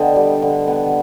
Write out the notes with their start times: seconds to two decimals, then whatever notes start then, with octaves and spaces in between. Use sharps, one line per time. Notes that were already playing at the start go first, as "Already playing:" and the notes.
Already playing: D3 B3 D#5 G5
0.16 G3
0.42 D3
0.68 B3